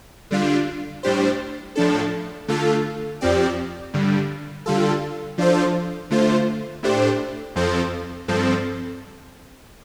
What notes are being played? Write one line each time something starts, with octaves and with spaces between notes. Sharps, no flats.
D3 G3 D4 F4
A2 G3 D4 G4 C5
A2 F3 D4 A4
D3 A3 F4 A4
F2 F3 C4 G4 D5
G2 D3 G3
D3 G3 F4 A4
F3 D4 F4 A4 C5
D3 A3 F4 C5
A2 A3 D4 G4 C5
F2 F3 C4 A4 C5
G2 F3 C4 A4